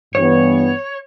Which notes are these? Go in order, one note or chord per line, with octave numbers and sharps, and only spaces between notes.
G2 E3 B3 C#5